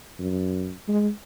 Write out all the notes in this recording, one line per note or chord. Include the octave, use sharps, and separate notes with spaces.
F#2
G#3